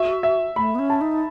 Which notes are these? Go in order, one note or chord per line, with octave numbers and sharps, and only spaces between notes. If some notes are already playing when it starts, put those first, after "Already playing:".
Already playing: F#4 E5
E5
A3 B5
B3
C#4
A5
D#4